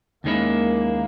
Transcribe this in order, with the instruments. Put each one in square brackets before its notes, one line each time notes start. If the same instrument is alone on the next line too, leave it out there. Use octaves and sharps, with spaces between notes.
[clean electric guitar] D#2 D#3 G#3 C#4 E4 [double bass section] A#3